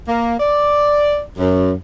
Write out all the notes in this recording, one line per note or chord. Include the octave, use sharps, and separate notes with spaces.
A#3
D5
F#2